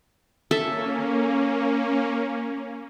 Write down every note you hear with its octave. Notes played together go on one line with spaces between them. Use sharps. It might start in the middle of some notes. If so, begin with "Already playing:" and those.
A#3 C#4 A4 E5